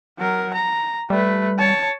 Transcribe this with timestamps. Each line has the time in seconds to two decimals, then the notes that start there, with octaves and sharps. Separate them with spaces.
0.19 F#3 A#4
0.54 A#5
1.10 G3 A3 B4
1.59 C#5 A5